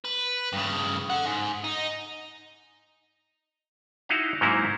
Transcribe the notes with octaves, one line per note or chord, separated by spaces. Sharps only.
B4
G2 C#3
A4 F#5
G#2
D#4
D#4 E4 F#4 D#5 F5
G#2 F#3 A#3 C4 D#4 E4